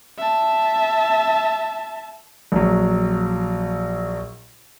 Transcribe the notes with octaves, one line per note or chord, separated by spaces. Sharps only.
E5 A5
A#1 F#3